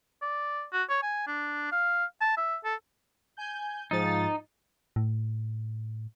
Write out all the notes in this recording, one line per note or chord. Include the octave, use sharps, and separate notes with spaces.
D5
F#4
C#5
G#5
D4
F5
A5
E5
A4
G#5 G6
G#2 F3 D#4 A6
A2